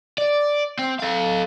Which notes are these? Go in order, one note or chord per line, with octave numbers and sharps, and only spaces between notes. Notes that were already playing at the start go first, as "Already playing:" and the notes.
D5
C4
A4 F5